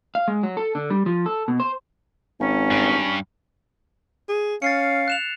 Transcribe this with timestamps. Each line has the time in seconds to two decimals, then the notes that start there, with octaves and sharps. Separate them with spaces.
0.15 F5
0.28 G#3
0.43 F#3
0.57 A4
0.75 D3
0.90 G3
1.06 F3
1.26 A4
1.48 B2
1.60 C5
2.40 G#1 C#4
2.71 G2
4.29 G#4
4.62 C#4 F5 A6 C7 C#7
5.08 F#6 E7 F7